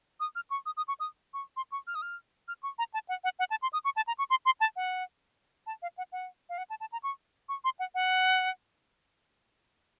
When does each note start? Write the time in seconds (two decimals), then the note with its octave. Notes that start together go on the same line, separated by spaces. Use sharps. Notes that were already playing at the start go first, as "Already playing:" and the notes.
0.20 D#6
0.36 F6
0.50 C#6
0.66 D#6
0.77 D#6
0.88 C#6
1.00 D#6
1.34 C#6
1.57 C6
1.72 C#6
1.87 F6
1.95 D#6
2.02 F6
2.48 F6
2.63 C#6
2.78 A#5
2.94 A5
3.09 F#5
3.24 F#5
3.39 F#5
3.50 A5
3.62 C6
3.73 D#6
3.85 C#6
3.96 A5
4.07 A#5
4.19 C#6
4.30 C6
4.45 C6
4.60 A5
4.76 F#5
5.67 A5
5.82 F5
5.98 F#5
6.12 F#5
6.49 F5
6.58 F#5
6.70 A5
6.80 A5
6.92 A#5
7.03 C#6
7.49 C#6
7.64 C6
7.79 F#5
7.95 F#5